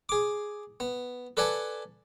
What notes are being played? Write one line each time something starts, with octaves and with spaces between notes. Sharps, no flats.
G#4 D6
B3
A4 B4 D5 F#5 G#5 A5